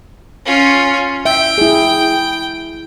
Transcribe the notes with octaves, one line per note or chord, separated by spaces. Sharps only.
C#4 F4
E5 G5
E4 G#4